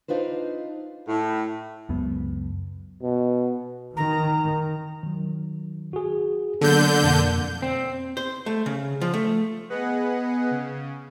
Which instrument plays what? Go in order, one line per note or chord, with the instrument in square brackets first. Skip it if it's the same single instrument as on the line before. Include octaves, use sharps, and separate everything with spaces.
[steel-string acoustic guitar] D4 D#4 F4 B4 C5
[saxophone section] A2
[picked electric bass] C#2 F#2 B3
[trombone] B2
[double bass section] D#3 [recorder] A#5
[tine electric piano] D#3 F#3
F#4 G#4
[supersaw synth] D3 G6 [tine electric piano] F#3 A#3 B3
[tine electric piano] F2 B2 A#3
[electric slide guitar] C4
[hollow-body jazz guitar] C5
A3
C#3
F3
A3
[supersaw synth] B3 G#4 B4 D#5 F#5
C#3